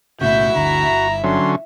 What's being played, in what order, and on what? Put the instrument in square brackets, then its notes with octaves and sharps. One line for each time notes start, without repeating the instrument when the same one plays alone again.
[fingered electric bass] B1 A2 C#3 [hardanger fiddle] E4 E5 [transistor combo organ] F#4 [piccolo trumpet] G6
[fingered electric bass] G1 D2 D3 [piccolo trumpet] A#5
[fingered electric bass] G1
[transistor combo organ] D3 F#3 C#4 [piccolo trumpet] C6